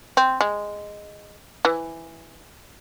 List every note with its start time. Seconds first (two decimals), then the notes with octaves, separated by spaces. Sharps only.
0.17 C4
0.41 G#3
1.65 E3